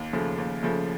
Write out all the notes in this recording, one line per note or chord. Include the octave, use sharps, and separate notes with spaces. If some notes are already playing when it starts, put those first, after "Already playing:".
Already playing: D#2
C#3 F3 A3
D#2
C#3 F3 A3